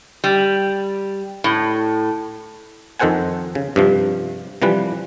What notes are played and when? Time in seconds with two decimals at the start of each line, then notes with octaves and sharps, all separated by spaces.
0.24 G3
1.44 A2
2.99 F2 D#3 A4 C5 F#5 G#5
3.55 C#3
3.76 G2 C3 F3
4.62 C3 E3 F3 G3 B4